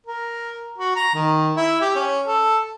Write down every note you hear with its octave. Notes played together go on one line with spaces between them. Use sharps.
A#4
F#4
A#5
D#3
E4
G4
C#4
A4